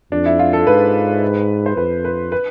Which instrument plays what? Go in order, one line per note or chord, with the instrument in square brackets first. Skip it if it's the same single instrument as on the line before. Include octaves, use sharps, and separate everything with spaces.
[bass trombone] F2 [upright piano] D4
[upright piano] E4
F4
A4
[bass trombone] G#2 [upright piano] B4
[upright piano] C5
[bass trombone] F2 [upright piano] B4
[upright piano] B4
B4